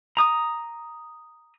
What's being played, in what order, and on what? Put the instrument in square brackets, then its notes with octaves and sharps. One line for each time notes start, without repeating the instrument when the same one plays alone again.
[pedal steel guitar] A#5 D#6